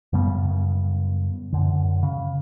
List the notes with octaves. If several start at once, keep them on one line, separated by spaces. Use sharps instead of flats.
F#2 C#3 G3 B3
F#2 D3
C#3